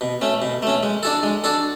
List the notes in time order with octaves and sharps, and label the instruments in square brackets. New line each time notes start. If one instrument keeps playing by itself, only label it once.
[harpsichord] B2
A3 C#4
B2
A3 C#4
G#3
D4 F#4 A4
G#3
D4 F#4 A4